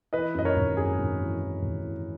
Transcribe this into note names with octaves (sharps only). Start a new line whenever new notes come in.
E3 B4 D#5
F#2 D#5
A#4 C#5
G#1
F#2 G#4
G#1
E3
E3
G#1
E3